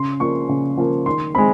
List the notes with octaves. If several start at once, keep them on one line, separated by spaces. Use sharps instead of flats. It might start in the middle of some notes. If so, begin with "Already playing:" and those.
Already playing: C#3 C6
F3 A#3 C#6
C#3
F3 A#3
D#3 C6
G#3 C4 B5